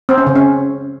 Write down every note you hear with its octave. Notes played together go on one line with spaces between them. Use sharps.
C4
C#4
C#3
C#4